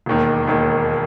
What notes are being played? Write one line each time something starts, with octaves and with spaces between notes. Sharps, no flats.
E1 D#2 D#3
E1 D#2 D#3